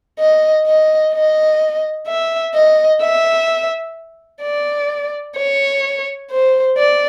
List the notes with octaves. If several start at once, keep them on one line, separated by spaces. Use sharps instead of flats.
D#5
D#5
D#5
E5
D#5
E5
D5
C#5
C5
D5